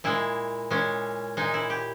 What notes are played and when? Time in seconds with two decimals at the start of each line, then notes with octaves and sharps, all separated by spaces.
0.04 A#2 G#3 E4
0.71 A#2 G#3 C#4
1.37 A#2 G#3 D#4
1.54 E4
1.70 G4